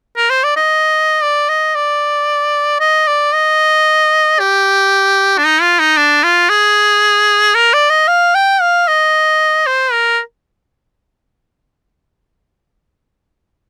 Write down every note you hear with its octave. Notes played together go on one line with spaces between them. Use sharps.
A#4
C5
D5
D#5
D5
D#5
D5
D#5
D5
D#5
G4
D4
D#4
F4
D#4
D4
F4
G#4
A#4
D5
D#5
F5
G5
F5
D#5
C5
A#4